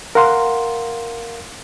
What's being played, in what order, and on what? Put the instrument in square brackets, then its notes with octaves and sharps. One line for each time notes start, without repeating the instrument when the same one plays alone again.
[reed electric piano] A#4 F5 F#5 C6